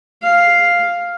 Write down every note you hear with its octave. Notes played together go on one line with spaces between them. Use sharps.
F5